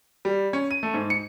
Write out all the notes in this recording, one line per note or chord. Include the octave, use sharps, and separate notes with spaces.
G3
C#4
D#7
A3
G#2
C#7